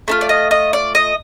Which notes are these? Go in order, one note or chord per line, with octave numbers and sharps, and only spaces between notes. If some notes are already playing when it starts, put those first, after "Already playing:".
A3 D4 F4
D5
D#5
D#5
D5
D#5